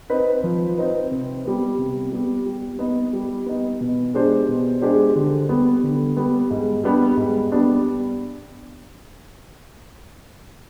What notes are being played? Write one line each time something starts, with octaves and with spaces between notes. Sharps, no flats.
C4 D#4 B4
F3
C4 D#4 B4
C3
G3 B3
C3
G3 B3
G3
B3 D#4
G3
B3 D#4
B2
G#3 D4 G4 C5
B2
G#3 D4 G4 C5
D3
G3 B3
D3
G3 B3
G#2
G3 B3 D4
G#2
G3 B3 D4